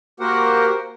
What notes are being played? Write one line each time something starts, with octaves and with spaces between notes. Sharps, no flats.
A#3 F#4 G4 A#4 C5 F#5